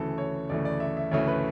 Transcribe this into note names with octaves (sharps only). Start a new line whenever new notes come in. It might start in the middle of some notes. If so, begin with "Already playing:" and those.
Already playing: D2 C#3 E3 A3 A4
C#5
D2 C#3 E3 A3 D5
D5
E5
E5
D2 C#3 E3 A3 C#5
B4